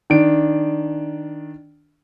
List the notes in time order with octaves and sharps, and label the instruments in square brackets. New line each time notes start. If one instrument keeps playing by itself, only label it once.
[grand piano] D#3 D4 D7